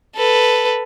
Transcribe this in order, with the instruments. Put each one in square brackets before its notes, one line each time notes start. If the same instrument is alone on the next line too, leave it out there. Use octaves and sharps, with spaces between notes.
[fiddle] A4 B4